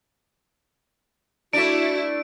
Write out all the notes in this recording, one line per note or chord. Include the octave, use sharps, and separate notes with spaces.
A3 D4 E4 F#4 D7